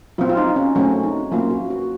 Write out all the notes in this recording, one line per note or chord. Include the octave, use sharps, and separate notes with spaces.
F#3 C4 F4
F4
D#4
C#4
F#3 A3 C4 C#4
D#4
F#3 A#3 C#4 F4
F#4
F#4